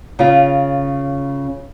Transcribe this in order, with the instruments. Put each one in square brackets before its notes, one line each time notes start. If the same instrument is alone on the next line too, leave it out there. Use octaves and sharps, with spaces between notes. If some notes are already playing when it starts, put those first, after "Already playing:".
[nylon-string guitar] C#3 F4